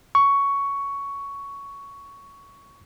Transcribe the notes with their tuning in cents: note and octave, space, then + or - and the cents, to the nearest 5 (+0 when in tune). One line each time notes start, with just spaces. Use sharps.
C#6 +10